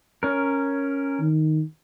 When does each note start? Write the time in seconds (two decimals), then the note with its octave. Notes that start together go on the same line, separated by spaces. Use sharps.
0.23 C#4 A#4
1.20 D#3